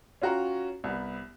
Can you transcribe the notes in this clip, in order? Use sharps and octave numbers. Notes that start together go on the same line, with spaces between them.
C#4 F4 F#4 G5 A#5
C2 B3